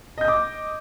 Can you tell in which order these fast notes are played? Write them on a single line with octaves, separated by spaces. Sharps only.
D#5 G6 D#6 D6